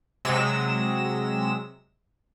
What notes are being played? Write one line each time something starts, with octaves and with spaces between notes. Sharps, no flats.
C3 F#3 G#3 E6 A#6 E7